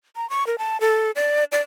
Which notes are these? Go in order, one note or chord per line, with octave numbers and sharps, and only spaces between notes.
A#5
C#6
A#4
A5
A4
D5
D5